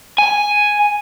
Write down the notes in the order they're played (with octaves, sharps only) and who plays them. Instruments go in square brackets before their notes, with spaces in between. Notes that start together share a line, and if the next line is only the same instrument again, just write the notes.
[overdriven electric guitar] G#5